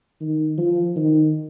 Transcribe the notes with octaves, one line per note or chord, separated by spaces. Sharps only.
D#3
F3
D#3